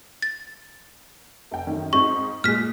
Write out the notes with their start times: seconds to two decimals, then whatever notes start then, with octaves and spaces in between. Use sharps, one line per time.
0.22 A6
1.51 F1 G5
1.67 F#2 D#3
1.93 G#2 C4 D#4 C#6
2.44 A#2 G#3 F6 B6